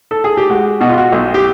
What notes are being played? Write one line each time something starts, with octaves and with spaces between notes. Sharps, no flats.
A4
G#4
G4
G#3 F#4
B2 F#4
F4
F#4
B1
G4